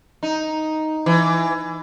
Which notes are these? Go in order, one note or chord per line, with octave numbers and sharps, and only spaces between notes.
D#4
E3